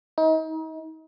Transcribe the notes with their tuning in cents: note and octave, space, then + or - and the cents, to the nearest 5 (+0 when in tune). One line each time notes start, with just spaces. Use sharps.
D#4 +35